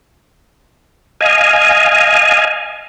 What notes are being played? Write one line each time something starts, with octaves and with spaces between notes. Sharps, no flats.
D#5 F5 G#5